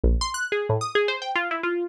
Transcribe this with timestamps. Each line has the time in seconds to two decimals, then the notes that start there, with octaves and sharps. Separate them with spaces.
0.04 A#1
0.21 C6
0.34 F#6
0.52 G#4
0.69 A2
0.81 D#6
0.95 G#4
1.08 C5
1.22 G5
1.36 F4
1.51 E4
1.63 F4